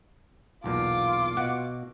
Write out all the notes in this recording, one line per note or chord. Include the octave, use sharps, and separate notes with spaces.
B1 E2 A#2 F4 D6
B2 F#4 F#5